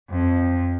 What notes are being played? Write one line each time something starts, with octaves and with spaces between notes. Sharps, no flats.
F2